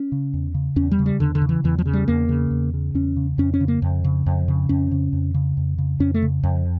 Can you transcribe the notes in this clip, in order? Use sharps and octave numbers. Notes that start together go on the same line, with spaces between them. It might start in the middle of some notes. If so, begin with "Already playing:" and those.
Already playing: C#4
C#3
E2
C#3
E2 C#4
G3
C#3
G3
E2 D3
D3
C#3
E3
E2 E3
F3
C#3
G3
E2 A#3
C#3
E2
C#3
E2 C#4
C#3
F2 C#4
C#4
C#3
A#3
F2
C#3
F2
C#3
F2 C#4
C#3
F2
C#3
F2
C#3
F2 C#4
A3
C#3
F2